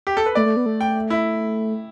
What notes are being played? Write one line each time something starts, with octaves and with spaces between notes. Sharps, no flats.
G4
A4
B4
A3 D5
A3
B3
A3
G5
E4